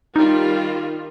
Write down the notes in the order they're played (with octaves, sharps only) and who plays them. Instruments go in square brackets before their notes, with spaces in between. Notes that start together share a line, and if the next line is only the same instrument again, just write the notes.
[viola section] D#3 G3 F4 [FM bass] D#4